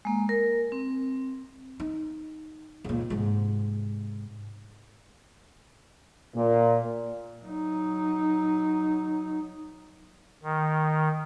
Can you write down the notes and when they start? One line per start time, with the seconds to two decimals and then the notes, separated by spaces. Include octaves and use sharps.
0.05 G#3 A#3
0.29 A#4
0.72 C4
1.80 D#4
2.84 C#2 A#2
3.10 G#2 C3
6.35 A#2
7.43 F#3 D#4
10.43 D#3